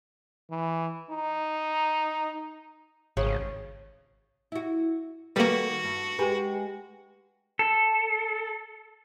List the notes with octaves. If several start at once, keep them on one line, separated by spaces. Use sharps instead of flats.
E3
D#4
G#1 C#3
E4 F#4
D#3 G3 A#3 F#4 A4 B4
G2
G#3 G4 B4
A4